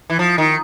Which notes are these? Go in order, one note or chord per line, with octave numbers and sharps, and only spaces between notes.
E3
F3
D#3